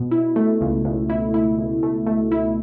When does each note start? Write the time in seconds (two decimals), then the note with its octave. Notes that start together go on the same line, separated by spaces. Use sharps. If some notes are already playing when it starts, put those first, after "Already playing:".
Already playing: B2
0.11 E4
0.36 A3
0.61 C#2
0.85 C#2
1.10 E4
1.34 E4
1.58 C#2
1.83 A3
2.07 A3
2.32 E4